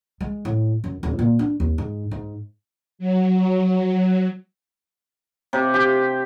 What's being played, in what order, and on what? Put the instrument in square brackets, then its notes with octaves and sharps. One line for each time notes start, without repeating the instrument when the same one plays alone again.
[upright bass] G#3
A2
F#2
D#1
A#2
D4
D#2
G#2
G#2
[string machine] F#3
[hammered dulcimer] C3
G4